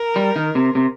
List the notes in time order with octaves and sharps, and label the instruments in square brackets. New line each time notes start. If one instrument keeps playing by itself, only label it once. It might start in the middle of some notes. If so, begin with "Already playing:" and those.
Already playing: [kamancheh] A#4
[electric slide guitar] G3
D#3
C3
C3